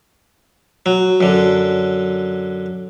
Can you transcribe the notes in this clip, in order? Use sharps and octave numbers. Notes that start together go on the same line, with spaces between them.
F#3
F#2 D3